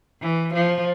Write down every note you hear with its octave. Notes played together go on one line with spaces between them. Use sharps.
E3
F3